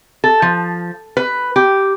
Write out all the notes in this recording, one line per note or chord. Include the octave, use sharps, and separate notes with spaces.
A4
F3
B4
G4